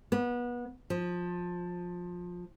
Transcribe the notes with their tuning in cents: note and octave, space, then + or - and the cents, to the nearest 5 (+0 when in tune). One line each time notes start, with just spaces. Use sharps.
B3 -25
F3 +20